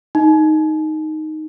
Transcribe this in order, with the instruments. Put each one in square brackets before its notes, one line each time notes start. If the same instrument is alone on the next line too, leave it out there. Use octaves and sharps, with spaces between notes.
[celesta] D#4